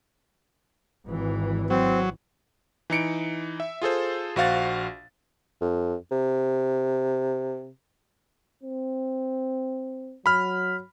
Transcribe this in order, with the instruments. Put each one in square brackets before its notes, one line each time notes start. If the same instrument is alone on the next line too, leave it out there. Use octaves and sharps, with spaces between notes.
[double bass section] G#1 E3
[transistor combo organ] F#3 [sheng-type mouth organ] C4
[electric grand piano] E3 D#4 C#7 D7
E5
F4 G#4 A4 C5
A#1 F#4 C5 F5 F#5 A6
[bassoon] F2
C3
[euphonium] C4
[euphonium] F#3 [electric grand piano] B5 F6